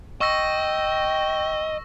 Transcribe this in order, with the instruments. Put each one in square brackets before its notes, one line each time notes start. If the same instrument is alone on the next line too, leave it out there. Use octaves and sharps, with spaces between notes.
[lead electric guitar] D#5 [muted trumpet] G5 [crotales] C#6 E6 A#6